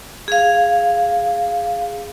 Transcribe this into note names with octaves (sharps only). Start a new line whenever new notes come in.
G#4 F5